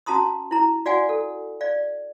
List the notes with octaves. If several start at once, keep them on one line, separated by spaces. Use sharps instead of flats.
C#4 F#4 A5 A#5 C6 D#6
E4 A#5
F#4 D5 F5 F#5 G#5
A4
D5 F5